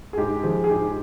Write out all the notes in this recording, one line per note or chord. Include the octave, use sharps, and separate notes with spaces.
G#4
G#2 G4
F3 G#4
G#4
G#2 G4